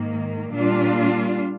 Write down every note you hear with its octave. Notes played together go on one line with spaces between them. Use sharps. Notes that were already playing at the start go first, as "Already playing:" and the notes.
Already playing: G#2 D#3 A#3
A#2 G3 D4 F4